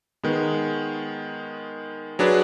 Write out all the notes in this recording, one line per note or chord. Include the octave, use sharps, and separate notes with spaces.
D#3 G#3 B3
F#3 D4 G#4 B4 D5